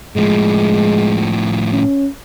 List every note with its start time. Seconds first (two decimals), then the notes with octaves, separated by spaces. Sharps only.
0.16 A2 F3 G#3
1.72 C#4